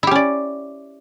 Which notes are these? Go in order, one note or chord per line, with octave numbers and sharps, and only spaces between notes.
C#4 E4 G4 D5